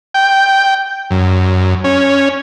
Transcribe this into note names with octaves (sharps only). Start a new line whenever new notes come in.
G5
F#2
C#4